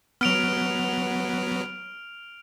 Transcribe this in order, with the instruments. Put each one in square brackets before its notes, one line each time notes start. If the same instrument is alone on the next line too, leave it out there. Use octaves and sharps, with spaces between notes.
[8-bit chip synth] F#3 B3 [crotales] F6 D7 F7